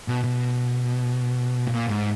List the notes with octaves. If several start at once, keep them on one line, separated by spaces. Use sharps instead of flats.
B2
B2
A#2
G#2